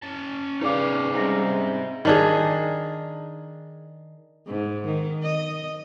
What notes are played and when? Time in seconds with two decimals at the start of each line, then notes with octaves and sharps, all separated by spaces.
0.02 C#4 A5
0.61 D#4 G#4 B4 D5 F5 D6
1.14 G#2 C3 G3 C#4 A#5 A#6
2.05 D#3 D4 G#4
4.47 G#2
4.85 D#3
5.23 D#5